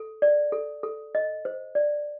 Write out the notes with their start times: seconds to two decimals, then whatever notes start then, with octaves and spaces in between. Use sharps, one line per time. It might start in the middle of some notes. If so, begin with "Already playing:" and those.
Already playing: A4
0.22 D5
0.52 A4
0.83 A4
1.15 D#5
1.45 C5
1.75 D5